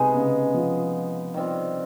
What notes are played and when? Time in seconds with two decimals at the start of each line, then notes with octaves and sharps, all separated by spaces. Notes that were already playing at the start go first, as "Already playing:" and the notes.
Already playing: C3 G#3 B3 D#4 G#4
0.14 C#3
0.54 F3
1.34 D#3 G3 C4 F4